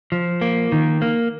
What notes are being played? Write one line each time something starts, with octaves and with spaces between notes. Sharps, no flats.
F3
A#3
D#3
A#3